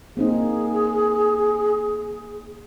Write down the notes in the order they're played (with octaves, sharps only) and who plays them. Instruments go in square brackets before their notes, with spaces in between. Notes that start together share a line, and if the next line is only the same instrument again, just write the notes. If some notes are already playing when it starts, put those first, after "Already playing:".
[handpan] A#3 C4 D#4 [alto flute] G#4